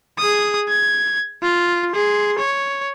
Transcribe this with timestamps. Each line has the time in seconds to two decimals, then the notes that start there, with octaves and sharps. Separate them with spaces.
0.19 G#4 D#6
0.68 G#6
1.43 F4
1.91 G#4 C6
2.39 C#5